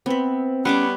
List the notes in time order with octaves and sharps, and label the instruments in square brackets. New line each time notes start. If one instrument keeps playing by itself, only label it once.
[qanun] B3 E5 [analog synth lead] C4
[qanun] G3 C#5 D6 [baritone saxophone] B3 [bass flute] C#4